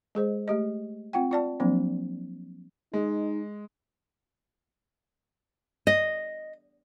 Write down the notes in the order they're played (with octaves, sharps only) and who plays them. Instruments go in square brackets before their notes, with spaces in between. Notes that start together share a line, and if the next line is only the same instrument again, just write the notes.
[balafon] G#3 G#4 C5 D#5
A3 G4 D#5
C4 F4 F#5 G5
F4 D5 A5
F3 F#3 A#3 C4 D4
[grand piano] G#3 [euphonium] D#4
[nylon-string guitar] D#5